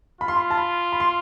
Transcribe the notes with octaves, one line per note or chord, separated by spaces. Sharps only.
F4 B5
C6
B5
A5
B5
B5
C6